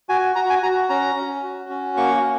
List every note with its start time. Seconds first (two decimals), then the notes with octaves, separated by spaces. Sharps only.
0.09 F#4 G#5
0.35 F#4 A#5
0.50 G#5
0.63 F#4 A#5
0.89 C#4 A#5
1.16 C#4
1.43 F#4
1.70 C#4
1.97 A#3 C#6
2.24 A#3